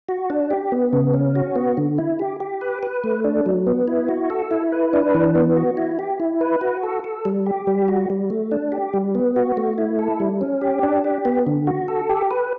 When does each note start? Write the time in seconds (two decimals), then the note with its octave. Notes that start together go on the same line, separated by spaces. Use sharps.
0.09 F#4
0.30 D4
0.51 G4
0.72 B3
0.93 C#3
1.14 C#4
1.35 F#4
1.56 B3
1.77 D3
1.98 E4
2.19 G4
2.40 G4
2.61 B4
2.83 B4
3.04 A3
3.24 D4
3.46 F#3
3.67 B3
3.88 E4
4.09 F#4
4.30 A4
4.51 E4
4.72 B4
4.93 D4
5.14 E3
5.35 B3
5.56 F#4
5.77 E4
5.99 G4
6.20 E4
6.41 B4
6.61 F#4
6.83 A4
7.04 A4
7.25 G3
7.46 G4
7.67 G3
7.88 F#4
8.10 G3
8.30 A3
8.51 D4
8.72 G4
8.93 G3
9.15 B3
9.36 F#4
9.57 A3
9.78 E4
9.99 A4
10.20 G3
10.41 C#4
10.61 G4
10.83 D4
11.04 G4
11.25 B3
11.47 D3
11.67 F#4
11.88 A4
12.09 G4
12.31 B4